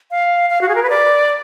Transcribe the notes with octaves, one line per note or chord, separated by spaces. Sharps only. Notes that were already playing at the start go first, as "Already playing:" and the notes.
F5
F5
F#4
G#4
A#4
B4
D5